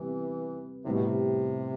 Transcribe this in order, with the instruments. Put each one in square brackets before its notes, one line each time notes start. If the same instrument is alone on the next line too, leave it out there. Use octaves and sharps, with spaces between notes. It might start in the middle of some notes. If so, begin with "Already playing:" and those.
Already playing: [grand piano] C3 G3 B3 [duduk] E3
[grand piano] A2 G3 B3 [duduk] C3
[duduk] B2
C3